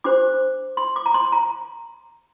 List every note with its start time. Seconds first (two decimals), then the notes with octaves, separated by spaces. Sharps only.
0.04 D4 G4 C5 D6
0.77 C6
0.96 D6
1.06 A#5
1.14 C6
1.32 A#5